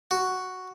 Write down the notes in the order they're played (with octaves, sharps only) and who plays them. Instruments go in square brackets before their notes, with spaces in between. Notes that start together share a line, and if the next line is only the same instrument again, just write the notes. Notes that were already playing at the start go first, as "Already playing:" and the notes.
[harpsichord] F#4